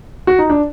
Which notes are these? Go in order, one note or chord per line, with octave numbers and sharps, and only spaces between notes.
F#4
D#4
D4